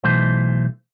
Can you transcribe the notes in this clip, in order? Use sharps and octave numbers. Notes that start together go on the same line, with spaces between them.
B1 E3 A3 C5